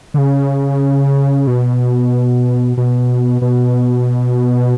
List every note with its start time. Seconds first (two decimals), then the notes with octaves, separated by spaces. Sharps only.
0.14 D3
0.18 C#3
1.47 B2
2.77 B2
3.42 B2